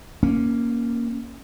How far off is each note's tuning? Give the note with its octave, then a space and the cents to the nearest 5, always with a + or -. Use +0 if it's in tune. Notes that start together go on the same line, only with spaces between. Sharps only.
A#3 +5 C#4 +0